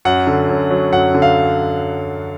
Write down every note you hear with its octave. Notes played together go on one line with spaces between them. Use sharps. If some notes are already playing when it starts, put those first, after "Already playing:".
F#2 F#5
D3
F#2
F#3
F#2 F#5
D3
F5